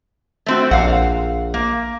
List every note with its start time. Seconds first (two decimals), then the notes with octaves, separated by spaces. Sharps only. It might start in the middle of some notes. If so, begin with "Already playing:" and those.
0.46 A3 C4 F#4
0.71 A#1 F5 F#5
1.54 A#3